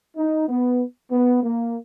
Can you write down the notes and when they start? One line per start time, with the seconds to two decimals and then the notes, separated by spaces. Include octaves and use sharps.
0.17 D#4
0.49 B3
1.12 B3
1.43 A#3